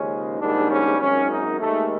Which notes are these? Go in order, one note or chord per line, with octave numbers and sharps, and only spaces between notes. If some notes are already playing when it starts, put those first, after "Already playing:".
Already playing: D#2 C#3 F3 G#3 C#4
A#1 G#2 D#3 G3 D4
C#4
G#1 F#2 D#3 C#4
D#4
D#2 D#3 G#3 A3